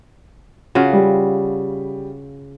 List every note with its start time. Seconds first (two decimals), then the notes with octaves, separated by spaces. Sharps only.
0.75 C#3 F4 F#4
0.93 G3